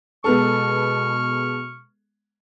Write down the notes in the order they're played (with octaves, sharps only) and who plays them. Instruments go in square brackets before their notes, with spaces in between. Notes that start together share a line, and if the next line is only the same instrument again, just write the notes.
[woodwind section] B2 C#6 F6 [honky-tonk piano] G#3 B3 A4